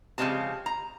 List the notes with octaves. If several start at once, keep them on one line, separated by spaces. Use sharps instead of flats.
C#3 F3 G3 G#3 C4 A5
A#5